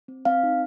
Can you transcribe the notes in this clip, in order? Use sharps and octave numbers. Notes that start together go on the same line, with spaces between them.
C4
C4 F5
D#4